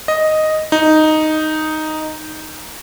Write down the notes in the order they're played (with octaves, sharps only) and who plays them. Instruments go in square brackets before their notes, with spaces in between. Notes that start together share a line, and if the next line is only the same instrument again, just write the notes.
[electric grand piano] D#5
D#4